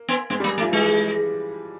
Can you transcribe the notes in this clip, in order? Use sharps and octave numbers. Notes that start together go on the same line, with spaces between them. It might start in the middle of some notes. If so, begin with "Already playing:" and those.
Already playing: A#3
B3
G#3 B3
G3 A#3
A3
F3
E3 G#3